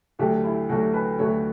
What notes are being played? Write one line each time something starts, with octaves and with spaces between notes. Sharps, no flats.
D2 D3 F#3 A3 G4
E4
D2 D3 F#3 A3 F#4
B4
D2 D3 F#3 A3 C#5